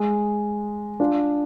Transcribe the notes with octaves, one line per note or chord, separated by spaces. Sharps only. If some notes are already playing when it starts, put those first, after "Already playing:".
Already playing: G#3
D4 F4